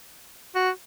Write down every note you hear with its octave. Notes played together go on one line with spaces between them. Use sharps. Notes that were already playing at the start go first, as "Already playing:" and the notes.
F#4